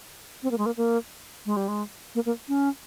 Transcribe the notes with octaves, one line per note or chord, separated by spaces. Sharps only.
C4
A#3
G#3
A#3
A#3
G#3
G3
G#3
A#3
A#3
C#4